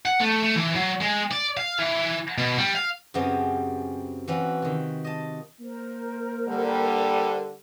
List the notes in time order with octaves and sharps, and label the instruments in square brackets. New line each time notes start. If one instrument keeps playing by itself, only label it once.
[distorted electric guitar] F#5
A3
A3
E3
F#3
G#3
D5
F5
E3
B2
G3
F5
[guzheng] F#2 C#3 B3 C4 G4 G#5
E3 C4 C#4 F4 F#4
C3 D#3
D#5 A5
[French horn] A#3 [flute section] A#4 C5
[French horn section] D3 G3